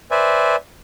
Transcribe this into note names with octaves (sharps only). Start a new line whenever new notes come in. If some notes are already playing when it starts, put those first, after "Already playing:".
B4 C5 D5 E5 G#5